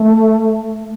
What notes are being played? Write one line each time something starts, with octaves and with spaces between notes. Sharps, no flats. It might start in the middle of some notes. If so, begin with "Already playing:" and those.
Already playing: A3